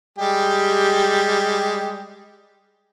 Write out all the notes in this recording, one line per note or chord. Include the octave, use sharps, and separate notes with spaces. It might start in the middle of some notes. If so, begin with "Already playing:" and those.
G3 G#3 G4